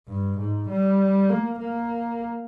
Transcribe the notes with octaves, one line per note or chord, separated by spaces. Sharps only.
G2
G#2
G3
A#3
A#3